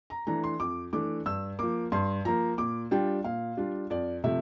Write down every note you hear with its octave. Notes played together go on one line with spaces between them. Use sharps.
A#5
E3 A3 D4 A#5
C6
F2 D6
E3 A3 D4 D6
G2 E6
F3 A#3 D6
G2 C6
F3 A#3 A#5
A#2 D6
G3 D4 F4 G5
A#2 F5
G3 D4 F4
F2 D5
C3 F3 A3 E5